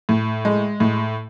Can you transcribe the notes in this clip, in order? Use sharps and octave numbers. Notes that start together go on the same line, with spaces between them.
A2
G#3
A2